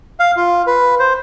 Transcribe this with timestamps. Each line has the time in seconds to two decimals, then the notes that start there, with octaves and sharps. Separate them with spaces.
0.20 F5
0.37 F4
0.67 B4
0.99 C5